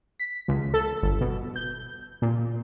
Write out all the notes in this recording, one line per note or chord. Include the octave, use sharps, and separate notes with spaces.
B6
C#2
A4
G1
B2
G6
A#2